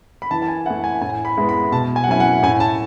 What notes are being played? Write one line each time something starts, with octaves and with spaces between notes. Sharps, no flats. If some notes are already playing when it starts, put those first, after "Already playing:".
B5
E3 A5
A5
G#5
A3 E4 F#5
G#5
A2 G#5
B5
G#3 B3 E4
B5
B2 A5
G#5
F#5
F#3 C#4 E4 G#5
F#5
A2 G#5
A5